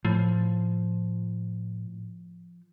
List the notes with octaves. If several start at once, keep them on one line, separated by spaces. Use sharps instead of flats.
A2 F3